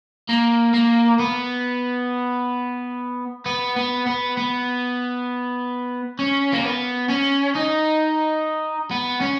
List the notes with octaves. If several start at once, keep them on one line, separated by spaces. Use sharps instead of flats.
A#3
A#3
B3
B3
B3
B3
B3
C#4
A#3
B3
C#4
D#4
B3
C#4